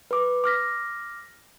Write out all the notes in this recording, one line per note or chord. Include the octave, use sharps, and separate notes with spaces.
B4 D6
D6 F6 A#6 B6